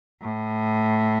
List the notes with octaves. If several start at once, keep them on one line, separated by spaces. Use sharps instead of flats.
A2